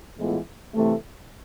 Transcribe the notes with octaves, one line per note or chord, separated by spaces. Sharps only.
A2 E3 G#3 B3 F4
C3 E3 A3